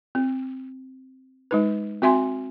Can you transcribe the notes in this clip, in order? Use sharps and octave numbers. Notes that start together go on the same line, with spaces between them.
C4
G#3 D#4 B4
C4 F#4 E5 G#5 C6